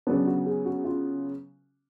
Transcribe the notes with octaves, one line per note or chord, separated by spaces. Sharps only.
C#3 F#3 B3 D4
F#4
G#4
F#4
F4